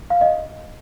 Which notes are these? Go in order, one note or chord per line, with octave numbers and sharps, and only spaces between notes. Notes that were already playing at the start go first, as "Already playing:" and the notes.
F5
D#5